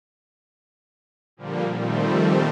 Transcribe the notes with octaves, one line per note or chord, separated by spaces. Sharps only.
A#2 D3 F3 G3 A#3
A#2 D#3 F3 G3 A3 C4